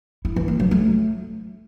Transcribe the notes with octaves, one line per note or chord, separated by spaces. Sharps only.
E4
E3
A#3
F#3
A3